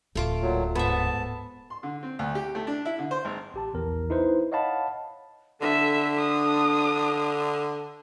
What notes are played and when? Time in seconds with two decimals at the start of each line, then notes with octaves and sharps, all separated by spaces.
0.15 D1 A3 F4 D6
0.42 A#2 F#3
0.75 G#2 B3 E5 A5
1.70 C6
1.83 D3
2.03 C4
2.19 D2
2.35 G4
2.55 A3
2.67 D4
2.85 E4
2.99 D3
3.11 C5
3.25 G#1
3.54 A1 G4 A5
3.73 A#1 E2 A#4
4.10 D#4 E4 B4 C5
4.52 C#5 D#5 F5 F#5 A5 B5
5.61 D3 D4 A4 E5
6.18 D#6